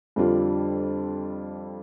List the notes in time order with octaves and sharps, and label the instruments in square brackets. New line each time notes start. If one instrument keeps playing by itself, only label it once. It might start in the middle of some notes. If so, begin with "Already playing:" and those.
[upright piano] F2 D3 G3 D4 F4